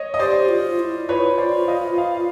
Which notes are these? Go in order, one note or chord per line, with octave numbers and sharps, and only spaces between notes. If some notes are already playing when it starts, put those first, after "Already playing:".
Already playing: C#5 D#5
D#5
G4 C5 D5
F4
E4
F4 B4 C#5
C5 D5
D#5 F5
D#5 F5